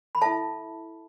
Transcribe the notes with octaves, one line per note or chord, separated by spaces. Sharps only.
B5
E4 A4 E5 A5